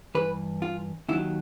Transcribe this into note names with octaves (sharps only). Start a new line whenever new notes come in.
G2 E3 B4
F4
D#2 D#3 F#3 E4